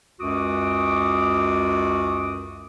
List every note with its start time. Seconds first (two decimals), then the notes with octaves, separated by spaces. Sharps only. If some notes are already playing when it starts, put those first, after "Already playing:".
0.20 C#2 F#2 F#4 D6 D#6